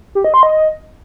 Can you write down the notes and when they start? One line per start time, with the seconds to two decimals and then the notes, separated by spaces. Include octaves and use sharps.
0.15 G4
0.24 D#5
0.34 C6
0.43 D#5